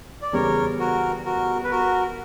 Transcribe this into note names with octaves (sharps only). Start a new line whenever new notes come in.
D5
E2 C#3 G3 A#4 C#5
F#4 A#4
F#4 A#4
B4
F#4 A#4